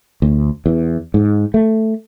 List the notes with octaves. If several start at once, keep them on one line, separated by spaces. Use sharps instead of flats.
D2
E2
G#2
A3